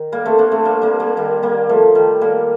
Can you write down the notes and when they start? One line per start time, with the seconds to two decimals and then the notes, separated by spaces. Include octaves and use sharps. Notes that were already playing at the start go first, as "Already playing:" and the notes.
Already playing: D#3
0.12 G3 A#3
0.25 A3 C4
0.38 A#3 D4
0.52 A3 C4
0.65 G3 A#3
0.82 G3 A#3
1.00 G3 A#3
1.17 D#3 G3
1.42 G3 A#3
1.69 F3 A3
1.95 D#3 G3
2.21 G3 A#3